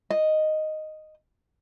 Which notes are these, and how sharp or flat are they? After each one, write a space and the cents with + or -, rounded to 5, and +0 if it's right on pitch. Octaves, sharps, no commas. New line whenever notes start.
D#5 -5